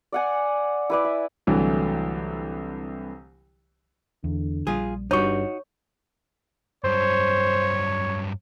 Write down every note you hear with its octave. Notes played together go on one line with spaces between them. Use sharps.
D5 F#5 G#5
E4 B4 D5
E5
C2 D3 E3 F#3 A3
E2 D3
A#1 G3 F4 G#4
D1 G1 G2 D#4 F#4 C#5 C#6
G2 F#3 C5 C#5